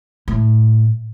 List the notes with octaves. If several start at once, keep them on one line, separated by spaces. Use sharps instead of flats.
A2